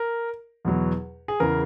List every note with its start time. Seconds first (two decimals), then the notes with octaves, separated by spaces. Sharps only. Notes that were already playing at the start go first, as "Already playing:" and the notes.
Already playing: A#4
0.65 E2 B2 F#3
1.28 G#4
1.40 E2 C#3 E3 A#4